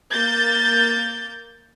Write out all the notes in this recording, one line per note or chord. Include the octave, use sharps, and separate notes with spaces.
A#3 G6 A6